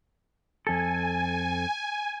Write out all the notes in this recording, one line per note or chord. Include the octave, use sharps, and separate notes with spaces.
F2 A4 G#5